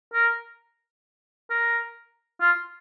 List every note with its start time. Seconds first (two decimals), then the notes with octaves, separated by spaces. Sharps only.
0.14 A#4
1.50 A#4
2.41 F4